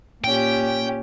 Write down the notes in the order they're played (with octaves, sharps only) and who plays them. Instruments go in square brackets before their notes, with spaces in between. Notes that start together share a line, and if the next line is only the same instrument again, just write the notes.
[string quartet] A#2 C#4 G4 [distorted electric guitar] G5